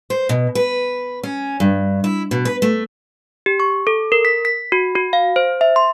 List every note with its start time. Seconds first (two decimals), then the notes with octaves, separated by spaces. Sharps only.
0.10 C5
0.29 B2
0.55 B4
1.23 C#4
1.60 G2
2.04 E4
2.31 B2
2.45 B4
2.62 A3
3.46 G4
3.60 C#6
3.87 A4
4.12 A#4
4.25 B6
4.45 B6
4.72 F#4
4.96 F#4
5.13 F5
5.36 C5
5.61 E5
5.76 C6